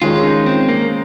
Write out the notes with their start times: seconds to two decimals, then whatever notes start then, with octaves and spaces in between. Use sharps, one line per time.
0.02 D#3 G#3 C#4 F4
0.23 D#4
0.46 C4
0.68 A#3